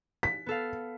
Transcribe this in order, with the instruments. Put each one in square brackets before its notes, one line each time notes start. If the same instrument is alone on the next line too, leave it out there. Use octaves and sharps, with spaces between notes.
[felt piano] B6
[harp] B3 A4 F5